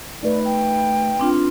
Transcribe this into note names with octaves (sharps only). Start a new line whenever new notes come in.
A3 D#4 B4 D5
G5
C4 D4 F4